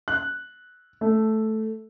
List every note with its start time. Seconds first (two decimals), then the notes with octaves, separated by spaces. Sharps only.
0.08 F#6
1.01 A3